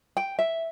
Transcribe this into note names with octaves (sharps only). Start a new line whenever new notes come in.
G5
E5